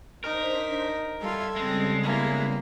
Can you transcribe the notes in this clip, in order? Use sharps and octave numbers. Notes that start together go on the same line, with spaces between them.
D4 D#4 A#4 C5 B6
G3 F4 A4 E5 G#6
C#3 G3 G#3 C4
A#3 B3 E4